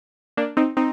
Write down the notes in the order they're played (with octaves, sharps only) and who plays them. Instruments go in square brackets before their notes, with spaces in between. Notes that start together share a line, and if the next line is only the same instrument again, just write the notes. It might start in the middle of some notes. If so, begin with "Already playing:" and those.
[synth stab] A#3 D4
C4 D#4
C4 D#4